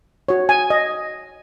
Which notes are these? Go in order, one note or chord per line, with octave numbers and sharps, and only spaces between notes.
F#4 C#5
G#5
D#5